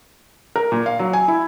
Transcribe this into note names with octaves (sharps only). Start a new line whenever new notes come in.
A#4
A#2
F5
F#3
G#5
E4